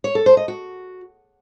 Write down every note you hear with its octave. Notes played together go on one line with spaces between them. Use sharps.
C#5
A4
C5
D#5
F#4